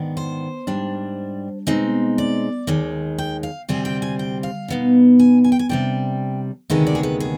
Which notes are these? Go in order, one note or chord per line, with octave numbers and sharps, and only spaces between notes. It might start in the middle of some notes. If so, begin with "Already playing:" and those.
Already playing: G#2 D#3 B3 D4
C5
G#2 G3 D4
B2 G#3 C4 D#4
D5
D#2 D#3 G#3
G5
F5
D2 C3 G3 C4 G#5
G5
G#5
G5
F5
B2 B3 D#4
G#5
G#5
G5
G#5
C3 G3 D4 G5
D2 C3 D#3 G#3 B3 D#5
D5
G#4
B4
G#4